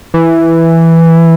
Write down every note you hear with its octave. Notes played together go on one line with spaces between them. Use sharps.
E3